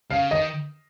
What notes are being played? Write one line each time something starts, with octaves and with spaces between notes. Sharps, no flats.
C#3 F5
D#3 D#5